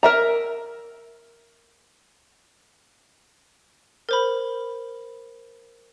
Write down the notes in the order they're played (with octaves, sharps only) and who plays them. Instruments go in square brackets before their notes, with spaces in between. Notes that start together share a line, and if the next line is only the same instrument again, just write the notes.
[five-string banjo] A#4 E5 A#5
[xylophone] A#4 C5 B5